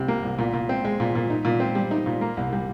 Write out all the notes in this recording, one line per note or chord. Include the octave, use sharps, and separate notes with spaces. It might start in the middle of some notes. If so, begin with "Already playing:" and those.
Already playing: C2 C3 G3
A#3
C2
A#2
A#2
C4
G#3
A#2
A#2
D#4
A#2
C4
G3
D#4
A#2
A#3
C2
G3